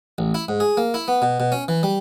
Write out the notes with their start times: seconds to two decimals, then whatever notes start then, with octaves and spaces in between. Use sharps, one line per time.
0.18 A1
0.34 E4
0.48 G#2
0.60 G#4
0.77 A#3
0.94 E4
1.08 B3
1.22 B2
1.40 B2
1.52 C#4
1.68 E3
1.83 G3